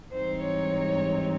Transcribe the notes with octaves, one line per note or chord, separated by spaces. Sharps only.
G#2 E3 G3 C4 D#4 C5
C#5